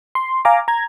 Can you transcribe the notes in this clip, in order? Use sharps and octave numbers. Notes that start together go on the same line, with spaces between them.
C6
F5 G#5 A#5 D6
A#5 G#6